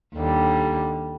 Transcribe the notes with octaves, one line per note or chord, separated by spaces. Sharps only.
D#2 D3 G3